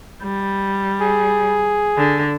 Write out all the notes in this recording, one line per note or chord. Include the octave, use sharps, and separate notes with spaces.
G3
G#4
D3